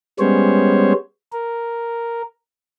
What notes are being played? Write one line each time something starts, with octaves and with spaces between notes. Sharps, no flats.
G3 G#3 B3 C#4 C5 C#5
A#4